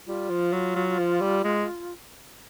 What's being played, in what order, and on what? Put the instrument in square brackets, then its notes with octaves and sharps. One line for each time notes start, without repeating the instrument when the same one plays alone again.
[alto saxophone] G3 [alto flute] F4
[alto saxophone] F3
F#3
F#3
F3
G3
G#3